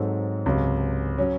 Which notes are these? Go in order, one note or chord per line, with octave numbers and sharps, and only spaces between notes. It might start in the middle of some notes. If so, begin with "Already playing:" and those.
Already playing: G#2 F#3 C4 D#4 A4
C#2 C3 F#3 C#4
F#3 C#4